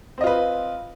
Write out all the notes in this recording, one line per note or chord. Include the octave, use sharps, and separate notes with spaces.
C4 F4 B4 D#5